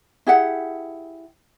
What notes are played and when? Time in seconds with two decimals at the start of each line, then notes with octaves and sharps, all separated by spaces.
0.27 E4 G4 G#4 F#5